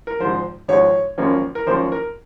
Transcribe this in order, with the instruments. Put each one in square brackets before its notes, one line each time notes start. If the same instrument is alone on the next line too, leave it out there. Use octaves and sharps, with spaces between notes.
[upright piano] A#4
G#1 G#2 F3 C5
G#1 G#2 F3 C#5
G#1 F#2 F3 A#3 C#4
A#4
G#1 F#2 F3 A#3 C#4 C5
A#4